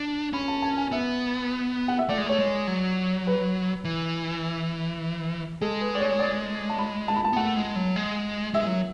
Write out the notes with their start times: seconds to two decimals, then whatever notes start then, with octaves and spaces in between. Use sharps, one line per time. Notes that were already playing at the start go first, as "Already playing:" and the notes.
Already playing: D4
0.33 C#4 B5
0.48 A5
0.62 A5
0.77 G#5
0.91 B3 E5
1.88 F#5
1.99 E5
2.09 A3 D5
2.18 G#3
2.27 A3 C#5
2.39 G#3
2.67 F#3
3.27 B4
3.85 E3
5.61 G#3 A4
5.81 B4
5.95 D5
6.00 C#5
6.19 D5
6.70 A5
6.79 B5
7.08 A5
7.16 B5
7.25 A5
7.33 B3
7.36 A3 F#5
7.56 G#3
7.76 F#3
7.96 G#3
8.54 G#3 E5
8.67 F#3